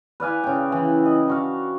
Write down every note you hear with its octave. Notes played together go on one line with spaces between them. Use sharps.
B4 D5 F5 G#5
C#3 G5
E3 E4
D#5
D4 F#4 F5